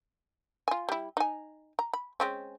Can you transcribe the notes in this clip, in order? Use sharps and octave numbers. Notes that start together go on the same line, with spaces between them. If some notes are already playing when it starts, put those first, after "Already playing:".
F4 G#5
G3 E4
D#4 G#5
A#5
B5
G#3 C4 C#4